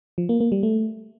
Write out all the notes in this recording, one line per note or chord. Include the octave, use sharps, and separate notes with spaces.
F3
A#3
A#3
G3
A3